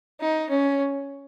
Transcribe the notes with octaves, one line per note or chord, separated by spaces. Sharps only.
D#4
C#4